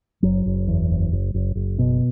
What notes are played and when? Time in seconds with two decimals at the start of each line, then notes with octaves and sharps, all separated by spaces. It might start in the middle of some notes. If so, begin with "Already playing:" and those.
0.23 F#1 F#3
0.46 F#1
0.68 E2
0.90 F#1
1.12 F#1
1.34 F#1
1.55 F#1
1.79 B2